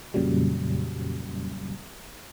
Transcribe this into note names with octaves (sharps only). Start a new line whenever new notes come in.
F2 A#2 C#3 F#3 G3